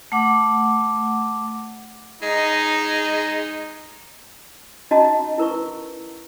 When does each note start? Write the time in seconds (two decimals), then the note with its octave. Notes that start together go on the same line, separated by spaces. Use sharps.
0.12 A3 F#5 D6
2.22 G#3 D#4
4.91 C#4 D#4 F#4 D#5 A5 A#5
5.38 E4 A#4 B4 C#6